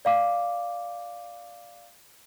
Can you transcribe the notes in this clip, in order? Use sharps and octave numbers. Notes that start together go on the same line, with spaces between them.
D5 F5 D6